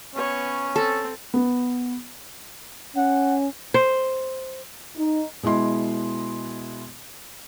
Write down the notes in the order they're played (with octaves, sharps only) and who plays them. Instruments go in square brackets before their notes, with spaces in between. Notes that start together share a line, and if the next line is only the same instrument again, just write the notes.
[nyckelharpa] B3 C#5 [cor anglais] C#4
[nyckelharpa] C4 [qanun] A4
[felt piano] B3
[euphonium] C#4 [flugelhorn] F#5
[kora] C5
[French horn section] D#4
[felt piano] B2 G#3 E4 C6